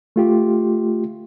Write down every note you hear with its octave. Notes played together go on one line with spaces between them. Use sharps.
A3 F4 G4